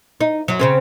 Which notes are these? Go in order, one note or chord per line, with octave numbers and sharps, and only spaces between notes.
D#4
F#2 F#3
C#3 C4 C#4